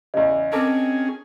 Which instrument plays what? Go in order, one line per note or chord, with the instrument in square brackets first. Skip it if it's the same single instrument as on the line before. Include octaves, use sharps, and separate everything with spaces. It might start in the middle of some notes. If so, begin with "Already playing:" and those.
[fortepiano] E2 C#3 [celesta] D#5
[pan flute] C4 [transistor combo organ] C#4 G#4 [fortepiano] A#4 A5 D6